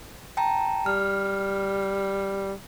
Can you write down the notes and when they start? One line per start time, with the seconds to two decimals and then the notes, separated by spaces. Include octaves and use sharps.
0.37 G5 A5 A#5
0.86 G3 F6